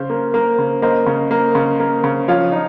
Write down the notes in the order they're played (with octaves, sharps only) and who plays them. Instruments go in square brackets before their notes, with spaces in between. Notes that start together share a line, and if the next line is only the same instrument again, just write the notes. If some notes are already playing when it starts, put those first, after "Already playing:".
Already playing: [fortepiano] C#3 [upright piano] C5
[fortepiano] A#3
A#3
C#3
[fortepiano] A#3 [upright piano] C5 D#5
[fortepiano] C#3
A#3
C#3
A#3
C#3
[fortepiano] F3 [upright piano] C#5 F5
[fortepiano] D#4